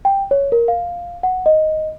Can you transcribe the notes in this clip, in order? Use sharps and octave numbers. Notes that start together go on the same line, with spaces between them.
G5
C#5
A#4
F5
F#5
D#5